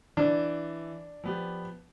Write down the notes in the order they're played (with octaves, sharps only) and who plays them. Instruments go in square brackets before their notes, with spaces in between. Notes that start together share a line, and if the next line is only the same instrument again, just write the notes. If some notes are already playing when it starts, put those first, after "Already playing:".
[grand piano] E3 [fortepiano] D4
[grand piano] F3 B3 G4